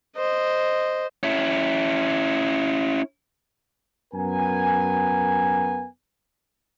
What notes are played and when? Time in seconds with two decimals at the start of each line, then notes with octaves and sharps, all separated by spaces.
0.17 C5 D#5
1.23 C#4 E4
4.14 F#2 B3 A#4 G#5